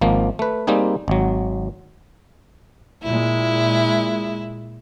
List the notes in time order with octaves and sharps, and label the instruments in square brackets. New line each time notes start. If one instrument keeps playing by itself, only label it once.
[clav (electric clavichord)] G#1 F3 A#3
A3 B4
G3 A#3 C4 D#4 G#4
G#1 F#3
[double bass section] A#2 G#3 [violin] E4